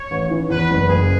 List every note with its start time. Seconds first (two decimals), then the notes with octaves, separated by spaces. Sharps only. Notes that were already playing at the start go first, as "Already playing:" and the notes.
Already playing: C#5
0.11 A1
0.30 E3
0.50 E2 B4
0.71 F#1
0.89 F#1 G#4